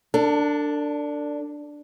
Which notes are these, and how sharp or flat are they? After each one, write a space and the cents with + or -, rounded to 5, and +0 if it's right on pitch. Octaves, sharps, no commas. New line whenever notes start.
D4 +0 A4 +45